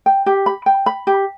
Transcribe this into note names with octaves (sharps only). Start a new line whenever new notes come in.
G5
G4
B5
G5
B5
G4